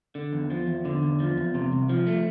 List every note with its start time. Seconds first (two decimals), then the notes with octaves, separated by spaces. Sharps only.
0.15 D3
0.33 E2
0.50 F3
0.68 E2
0.85 D3
1.03 E2
1.20 F3
1.37 E2
1.54 C3
1.72 C2
1.89 F3
2.07 A3